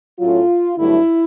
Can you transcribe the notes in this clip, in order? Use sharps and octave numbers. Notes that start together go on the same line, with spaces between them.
A2 F#3 A3 C#4 F4
G2 D3 F#3 A3 E4